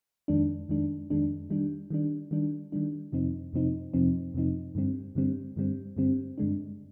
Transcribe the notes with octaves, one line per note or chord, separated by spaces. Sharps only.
F2 D#3 G#3 D4
F2 D#3 G#3 D4
F2 D#3 G#3 D4
D#3 G3 D4
D#3 G3 D4
D#3 G3 D4
D#3 G3 D4
F2 C3 F3 C4 D#4
F2 C3 F3 C4 D#4
F2 C3 F3 C4 D#4
F2 C3 F3 C4 D#4
G2 D3 G3 C4
G2 D3 G3 C4
G2 D3 G3 C4
G2 D3 G3 C4
G2 D3 G#3 D4